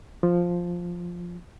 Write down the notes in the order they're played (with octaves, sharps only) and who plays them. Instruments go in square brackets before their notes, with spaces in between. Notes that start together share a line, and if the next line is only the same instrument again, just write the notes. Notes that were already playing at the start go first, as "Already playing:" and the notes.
[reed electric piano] F3